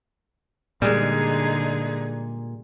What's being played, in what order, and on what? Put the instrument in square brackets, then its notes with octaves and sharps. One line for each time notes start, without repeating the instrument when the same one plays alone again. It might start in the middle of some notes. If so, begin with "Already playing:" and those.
[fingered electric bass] A#2 [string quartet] D3 D#4 G#4 [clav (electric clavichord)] G3 G#3